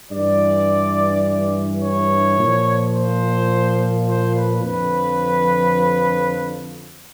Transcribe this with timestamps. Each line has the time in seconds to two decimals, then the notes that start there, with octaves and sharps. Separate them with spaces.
0.12 G2 E3 D5
1.81 C#5
2.38 A#2 F3
2.95 C5
4.07 C5
4.36 B4
4.64 F2 D3 F3 B4